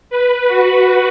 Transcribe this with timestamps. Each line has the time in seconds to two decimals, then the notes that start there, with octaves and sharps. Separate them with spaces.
0.10 B4
0.47 F#4